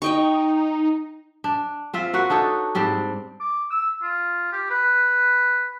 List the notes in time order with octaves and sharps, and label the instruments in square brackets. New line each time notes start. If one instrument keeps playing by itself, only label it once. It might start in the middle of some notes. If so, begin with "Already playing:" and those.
[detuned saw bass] D#4 [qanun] D#5 G5 C#6
[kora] D4
C4 F4 E5
A#3 F#4 B4 F#5
D4 D#4 A4 C#5
G#2 G3 C4 D4
[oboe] D6
E6
F4
G4
B4